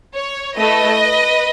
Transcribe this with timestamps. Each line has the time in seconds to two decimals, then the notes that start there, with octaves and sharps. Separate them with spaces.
0.15 C#5
0.56 A3 E4 A4 B4 D#5